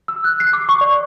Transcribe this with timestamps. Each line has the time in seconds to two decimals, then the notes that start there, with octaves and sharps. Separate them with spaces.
0.08 E6
0.24 F#6
0.40 C7
0.53 D6
0.69 C#6
0.81 D5